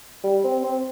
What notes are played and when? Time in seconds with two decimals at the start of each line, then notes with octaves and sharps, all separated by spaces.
0.24 G3
0.44 C4
0.63 C4